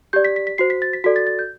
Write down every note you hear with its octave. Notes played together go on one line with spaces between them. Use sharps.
G4 D5 G6
B6
B6
B6
F#4 C5 C7
B6
A6
B6
F#4 A4 D5 B6
A6
A6
G6